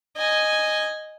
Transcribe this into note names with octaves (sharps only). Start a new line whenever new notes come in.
D#5 G#5